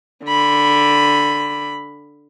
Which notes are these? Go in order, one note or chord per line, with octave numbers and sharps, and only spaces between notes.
D3 B5